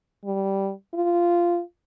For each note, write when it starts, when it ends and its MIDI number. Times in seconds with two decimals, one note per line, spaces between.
0.25 0.71 55
0.95 1.61 65